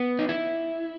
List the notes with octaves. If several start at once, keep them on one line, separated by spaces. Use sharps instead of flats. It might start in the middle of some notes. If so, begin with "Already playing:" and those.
Already playing: B3
D#4
E4